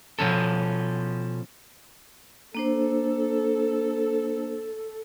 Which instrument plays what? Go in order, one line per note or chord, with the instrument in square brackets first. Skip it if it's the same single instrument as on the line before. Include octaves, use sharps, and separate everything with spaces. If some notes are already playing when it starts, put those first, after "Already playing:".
[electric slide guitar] B2 F3 C#4 A4
[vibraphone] A#3 D4 C5 [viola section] A4